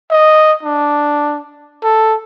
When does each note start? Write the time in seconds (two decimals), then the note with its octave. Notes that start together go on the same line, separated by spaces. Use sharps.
0.11 D#5
0.63 D4
1.83 A4